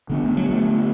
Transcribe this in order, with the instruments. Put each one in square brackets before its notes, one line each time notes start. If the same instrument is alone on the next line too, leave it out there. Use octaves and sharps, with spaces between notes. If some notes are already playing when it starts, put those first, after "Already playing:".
[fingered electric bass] D3 B3 D4
[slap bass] A3
F#3
A3